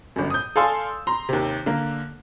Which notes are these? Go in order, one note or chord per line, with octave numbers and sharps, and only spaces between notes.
G1 F#2
D#6 G6
A4 D5 F5 G#5 C6 E6
A#5 C6
D#2 C3
D3 A#3